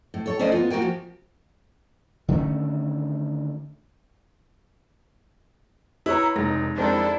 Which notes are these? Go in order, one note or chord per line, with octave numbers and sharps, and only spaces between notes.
A2
A4 C#5
A3 C#4 C5 D5 D#5
B3 F4
A#3 F#4 A#4 G5 G#5
F3
D3 D#3 A3 C#4
E4 B4 C#5 A#5
F1 G#3 D#4 A#6
F2 G#3 D4 E4 A4 A#4 C5 D5